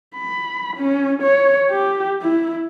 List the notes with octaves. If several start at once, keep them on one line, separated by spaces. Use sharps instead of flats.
B5
C#4
C#5
G4
E4